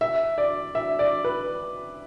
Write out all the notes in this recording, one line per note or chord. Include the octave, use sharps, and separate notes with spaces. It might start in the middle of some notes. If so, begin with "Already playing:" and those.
E5
D5
E5
D5
B4